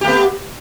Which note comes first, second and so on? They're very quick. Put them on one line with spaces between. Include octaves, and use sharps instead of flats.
G4 A3 B3